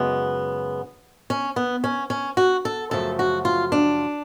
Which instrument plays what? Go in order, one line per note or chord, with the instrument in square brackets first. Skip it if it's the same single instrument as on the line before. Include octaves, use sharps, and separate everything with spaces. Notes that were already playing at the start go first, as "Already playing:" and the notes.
Already playing: [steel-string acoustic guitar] F#2 C#3 G#3 B3
C#4
B3
C#4
C#4
F#4
A4
F#2 C#3 F3 A3 A4
F#4
F4
D4